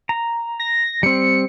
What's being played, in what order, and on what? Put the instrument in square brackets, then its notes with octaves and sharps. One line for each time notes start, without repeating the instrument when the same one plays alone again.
[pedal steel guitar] A#5
[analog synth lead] A#6
[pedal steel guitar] G3 C4 [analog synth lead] C#7